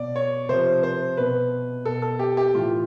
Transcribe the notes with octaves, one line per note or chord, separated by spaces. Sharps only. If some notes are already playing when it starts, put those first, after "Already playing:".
Already playing: B2 D5
C#5
C3 F3 C5
C5
B2 B4
B2 A4
A4
G4
G4
A2 E3 F4